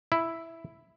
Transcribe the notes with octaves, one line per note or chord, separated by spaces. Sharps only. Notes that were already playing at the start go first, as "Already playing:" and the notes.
E4